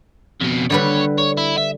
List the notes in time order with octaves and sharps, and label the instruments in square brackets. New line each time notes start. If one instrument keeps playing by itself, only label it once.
[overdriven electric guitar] F2 B2
[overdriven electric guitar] D#2 C#5 [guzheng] D3 G3 B4
[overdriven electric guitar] C#5
E4
E5